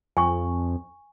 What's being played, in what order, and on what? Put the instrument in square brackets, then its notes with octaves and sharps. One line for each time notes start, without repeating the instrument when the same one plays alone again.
[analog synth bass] F2 [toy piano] G#5 C#6